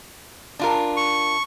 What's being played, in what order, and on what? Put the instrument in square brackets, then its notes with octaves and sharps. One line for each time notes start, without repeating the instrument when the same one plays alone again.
[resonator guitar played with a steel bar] D4 F4 A#4
[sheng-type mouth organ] C#6